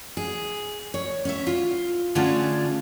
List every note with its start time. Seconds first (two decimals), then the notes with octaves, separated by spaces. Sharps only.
0.17 G#4
0.94 C#5
1.25 C#4 E5
1.47 F4
2.15 D3 A3 C#4 D4 F4 G#4